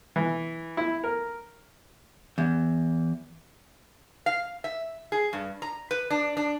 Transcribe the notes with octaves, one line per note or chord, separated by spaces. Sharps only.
E3
E4
A#4
E2
F5
E5
G#4
G2
A#5
B4
D4
D4